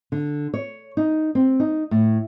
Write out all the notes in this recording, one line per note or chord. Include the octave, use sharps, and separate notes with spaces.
D3
C#5
D#4
C4
D#4
A2